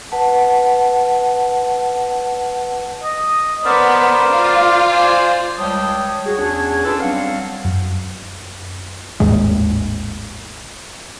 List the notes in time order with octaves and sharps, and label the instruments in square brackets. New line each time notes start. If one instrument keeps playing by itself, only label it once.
[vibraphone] B4 F#5 A5
[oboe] D#5
[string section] B3 [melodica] A#4 C5 [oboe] D5
[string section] F4
[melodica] C5 D5 G#5
[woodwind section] C#2 G3 C#5 G5 A5 D#6
F#4 G#4
E2 C#4 D4 G#4 C#5 A5
C#4 D4 F4 G#4 A4 B4
F#3 G3 C4 D4 F5 F#5
[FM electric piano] F#2
[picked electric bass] G#1 D#2 A2 G#3